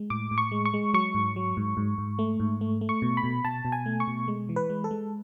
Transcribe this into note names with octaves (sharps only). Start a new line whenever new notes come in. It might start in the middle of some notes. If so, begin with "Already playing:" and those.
Already playing: G#3
A2 D6
A2
C#6
G#3
C#6
G#3
F#3 C#6
G#2
F#3
G#2
G#2
G#2
A3
G#2
A3
A3
C#6
B2
B5
B2
B2 A5
B2
G#5
A3
C#6
B2
G#3
E3
B4
G#3
A4
G#3